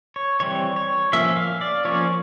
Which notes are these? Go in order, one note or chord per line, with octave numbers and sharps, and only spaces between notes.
C#5
E3 G3 C4 C#5
C#5
F3 A#3 C#4 E5
F5
D5
F3 A#3 C#4 C#5